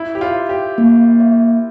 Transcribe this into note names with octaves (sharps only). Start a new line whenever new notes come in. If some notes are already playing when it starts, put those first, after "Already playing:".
Already playing: E4 E5
G4
F4
E5
G4
A#3
E5